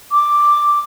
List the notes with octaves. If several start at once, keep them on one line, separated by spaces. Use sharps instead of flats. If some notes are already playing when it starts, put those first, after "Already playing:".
D6